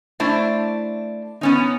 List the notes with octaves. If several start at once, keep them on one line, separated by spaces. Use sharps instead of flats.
A3 D4 E4 C5 D5
B3 C#4 D#4